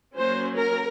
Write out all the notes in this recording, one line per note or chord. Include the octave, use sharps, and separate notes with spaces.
F#3 A#3 C#4 C5
A#4